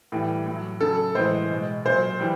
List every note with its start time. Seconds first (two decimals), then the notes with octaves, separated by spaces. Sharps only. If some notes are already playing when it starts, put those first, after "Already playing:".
0.12 A2 E3 G3
0.46 A2 F#3
0.80 C#3 F#3 A4
1.15 A2 E3 G#3 C5
1.50 B2 G#3
1.85 A#2 F#3 C5
2.20 E3 G3